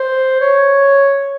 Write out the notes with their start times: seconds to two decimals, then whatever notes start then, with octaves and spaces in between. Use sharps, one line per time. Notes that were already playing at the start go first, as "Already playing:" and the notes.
Already playing: C5
0.41 C#5